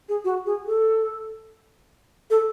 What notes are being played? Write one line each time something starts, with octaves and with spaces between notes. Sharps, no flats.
G#4
F#4
G#4
A4
A4